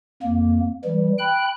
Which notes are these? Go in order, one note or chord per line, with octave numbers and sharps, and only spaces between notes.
F2 A#3
E3 G3
G5 B5 F#6